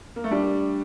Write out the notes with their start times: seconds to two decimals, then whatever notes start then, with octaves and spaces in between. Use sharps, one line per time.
0.16 A#3
0.24 A3
0.31 G3 D4